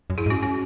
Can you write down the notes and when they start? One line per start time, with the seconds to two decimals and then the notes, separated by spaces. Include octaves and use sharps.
0.10 F#2
0.18 E4 G#4
0.26 G#2
0.30 C#4 F#4
0.43 C#4 F#4